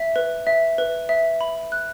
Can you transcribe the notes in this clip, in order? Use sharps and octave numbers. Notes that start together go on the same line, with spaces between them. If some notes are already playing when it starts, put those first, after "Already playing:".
Already playing: E5
B4
E5
B4
E5
B5
F#6